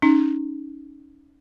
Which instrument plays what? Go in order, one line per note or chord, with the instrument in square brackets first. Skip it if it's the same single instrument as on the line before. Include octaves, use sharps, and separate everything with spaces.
[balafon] C#4 D#4